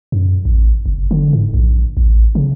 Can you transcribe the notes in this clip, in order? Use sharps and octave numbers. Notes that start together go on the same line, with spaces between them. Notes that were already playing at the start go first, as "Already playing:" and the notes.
F#2
A1
F#1
D3
G#2
A#1
A1
C#3